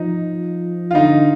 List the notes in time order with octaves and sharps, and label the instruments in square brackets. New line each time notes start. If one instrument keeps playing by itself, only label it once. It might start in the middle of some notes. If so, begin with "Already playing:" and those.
Already playing: [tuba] F3 [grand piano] D#4
[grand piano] F4
[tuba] D3 [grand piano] D#4